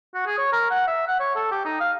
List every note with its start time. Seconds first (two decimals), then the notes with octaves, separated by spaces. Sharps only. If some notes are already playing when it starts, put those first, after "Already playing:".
0.14 F#4
0.26 G#4
0.38 C#5
0.53 A#4
0.71 F#5
0.87 E5
1.08 F#5
1.20 C#5
1.36 A4
1.51 G4
1.65 D#4
1.80 F5